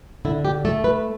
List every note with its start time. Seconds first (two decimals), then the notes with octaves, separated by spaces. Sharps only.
0.25 D3 E4
0.45 G4
0.65 A3 A4
0.84 B4